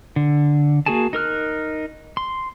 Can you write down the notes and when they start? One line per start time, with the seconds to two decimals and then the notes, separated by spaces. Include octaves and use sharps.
0.16 D3
0.86 A#3 F#4 G#4 G#5 A5
1.13 D#4 A#4 F6 F#6
2.17 C6